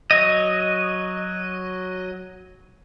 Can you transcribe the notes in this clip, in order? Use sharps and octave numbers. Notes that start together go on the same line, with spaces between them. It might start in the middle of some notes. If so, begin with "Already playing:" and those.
F#3 D#5